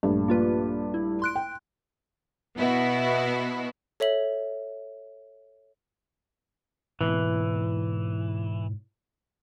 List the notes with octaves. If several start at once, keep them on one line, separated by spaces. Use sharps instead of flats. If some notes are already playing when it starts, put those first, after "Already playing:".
A#1 G2 A3
A#3 F4 B4
E4
C6 F#6 D7
G5
B2 B3 E4 F#4
A4 C#5 E5 F#7
G#2 B2 E3 A#3